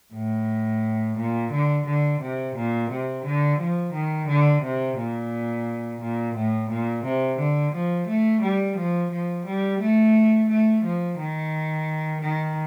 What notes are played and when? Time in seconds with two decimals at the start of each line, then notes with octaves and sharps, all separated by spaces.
0.14 A2
1.17 A#2
1.52 D3
1.86 D3
2.21 C3
2.56 A#2
2.90 C3
3.25 D3
3.59 F3
3.93 D#3
4.28 D3
4.62 C3
4.97 A#2
6.01 A#2
6.35 A2
6.70 A#2
7.04 C3
7.38 D3
7.73 F3
8.07 A3
8.42 G3
8.77 F3
9.11 F3
9.45 G3
9.80 A3
10.49 A3
10.83 F3
11.18 D#3
12.21 D#3